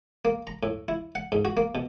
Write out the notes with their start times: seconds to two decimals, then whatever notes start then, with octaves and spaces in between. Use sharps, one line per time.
0.25 A#3
0.47 A#5
0.63 A2
0.88 E4
1.15 F#5
1.32 G#2
1.45 F#4
1.57 A#3
1.75 B2